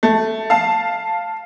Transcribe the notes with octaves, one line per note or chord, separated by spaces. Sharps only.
A3
F5 A5